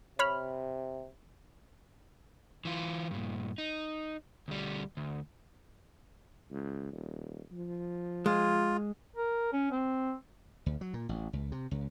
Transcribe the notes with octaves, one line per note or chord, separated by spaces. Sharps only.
C3 C#5 B5 F6
E3 F4
G2 A#2
D#4
D2 G3
D2
C#2
D#1
F3
G#3 F4
A#4
C#4
C4
D2
F#3
A#2
A1
C#2
C3
C#2